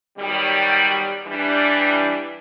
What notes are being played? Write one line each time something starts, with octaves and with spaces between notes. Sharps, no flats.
B2 D#3 F#3 G3
E3 G3 D4